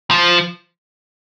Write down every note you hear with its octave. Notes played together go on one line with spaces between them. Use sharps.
F3